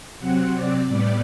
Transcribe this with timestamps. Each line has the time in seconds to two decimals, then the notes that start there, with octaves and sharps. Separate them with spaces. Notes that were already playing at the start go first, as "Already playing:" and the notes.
0.20 C3 F#3 C4 F#5
0.54 D5
0.88 A2 G3 B3